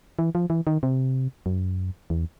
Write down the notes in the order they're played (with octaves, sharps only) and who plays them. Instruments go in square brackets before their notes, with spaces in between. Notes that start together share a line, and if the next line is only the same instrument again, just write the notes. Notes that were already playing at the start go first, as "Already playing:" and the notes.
[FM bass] E3
F3
E3
D#3
C3
F#2
E2